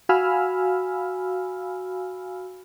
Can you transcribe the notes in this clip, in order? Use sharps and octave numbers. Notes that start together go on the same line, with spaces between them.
F#4 F5 G#5 B5 E6 F6